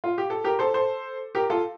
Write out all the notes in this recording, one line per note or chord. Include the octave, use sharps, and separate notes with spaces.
F4
G4
A4
G4 A#4
A4 C5
A4 C5
G4 A#4
F4 A4